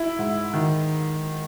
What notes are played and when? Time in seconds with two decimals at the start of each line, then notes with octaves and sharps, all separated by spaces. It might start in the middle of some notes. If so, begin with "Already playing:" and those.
Already playing: E4
0.19 G#2
0.54 D#3